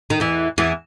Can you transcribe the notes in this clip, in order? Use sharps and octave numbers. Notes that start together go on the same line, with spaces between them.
D#3
E2 E3
E2 E3